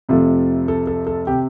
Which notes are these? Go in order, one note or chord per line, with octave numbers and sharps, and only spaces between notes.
F2 C3 F3 A3
A4
A4
A4
C3 G4